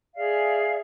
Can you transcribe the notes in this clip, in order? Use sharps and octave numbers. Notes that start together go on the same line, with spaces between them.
G#4 D5 E5 F5